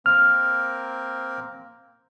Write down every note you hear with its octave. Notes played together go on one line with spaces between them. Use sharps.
A#3 C4 A#4 F6